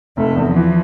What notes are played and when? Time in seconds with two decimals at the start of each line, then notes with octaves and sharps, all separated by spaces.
0.17 F1 A3
0.36 E2
0.46 F3
0.56 E3